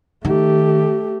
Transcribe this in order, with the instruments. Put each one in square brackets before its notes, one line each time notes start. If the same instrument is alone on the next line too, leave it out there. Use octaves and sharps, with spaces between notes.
[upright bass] D#3 [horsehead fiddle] A3 G4